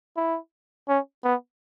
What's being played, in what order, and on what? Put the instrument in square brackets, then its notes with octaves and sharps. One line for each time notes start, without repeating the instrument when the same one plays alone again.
[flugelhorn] E4
C#4
B3